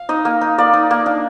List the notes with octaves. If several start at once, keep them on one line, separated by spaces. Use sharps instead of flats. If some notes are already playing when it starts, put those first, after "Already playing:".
Already playing: F5
D#4 D#5
A#3
D#4
A#3 D5
D#4
A#3
D4